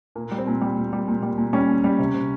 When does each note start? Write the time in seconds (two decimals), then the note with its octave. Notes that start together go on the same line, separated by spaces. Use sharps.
0.15 A#2 A#3
0.31 G3
0.38 C4
0.47 A#2
0.61 G3
0.78 A#2
0.93 G3
1.08 A#2
1.22 G3
1.38 A#2
1.53 G3 C#4
1.69 A#2
1.84 G3
1.99 C3
2.14 C3